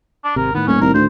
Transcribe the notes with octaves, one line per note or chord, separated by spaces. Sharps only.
D4
G#1 C3 A#4
A2 D#3 B3
D#1 C#4
C2 A#4
D2 C5